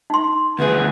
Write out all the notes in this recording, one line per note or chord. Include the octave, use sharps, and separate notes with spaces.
D#4 C6
D2 G#4 B4